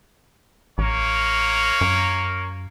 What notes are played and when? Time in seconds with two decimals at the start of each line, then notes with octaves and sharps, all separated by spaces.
0.78 A1 A#3 A#4 C#5
1.81 F#2